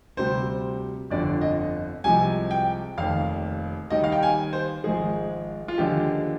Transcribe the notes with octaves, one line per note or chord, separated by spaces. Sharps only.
D2 C3 G3 C5
G1 F2 D3 D5
D#5
C2 C3 F3 G#3 G#5
G5
F1 D#2 D#3 F5
D#2 D#3 G3 D#5
F5
G5
G#5
C5
G#1 G#2 F3 G#3 G#4
F4
D#2 D3 F3 G#3 G4